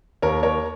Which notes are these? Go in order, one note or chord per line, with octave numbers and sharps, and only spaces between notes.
D#2 A#4 C#5
A#4 C#5